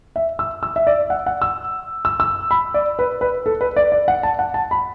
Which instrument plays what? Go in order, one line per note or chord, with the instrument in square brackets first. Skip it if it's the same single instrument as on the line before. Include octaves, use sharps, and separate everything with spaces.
[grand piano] E5
E6
E6
E5
D5
F#5
F#5
E6
E6
E6
B5
D5
B4
B4
A4
B4
D5
D5
F#5
A5
F#5
A5
B5